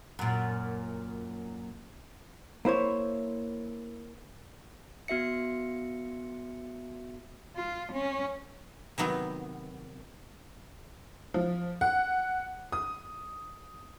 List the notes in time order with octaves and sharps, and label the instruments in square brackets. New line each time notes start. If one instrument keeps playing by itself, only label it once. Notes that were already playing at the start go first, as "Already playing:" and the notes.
[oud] F#2 A#2
[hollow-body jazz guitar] A#3 E4 C5 C#5
[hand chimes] B3 F#4 E5 C#7
[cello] F4
C#4
[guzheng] C3 D#3 F#3 B3
[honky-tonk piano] F3
F#5
D#6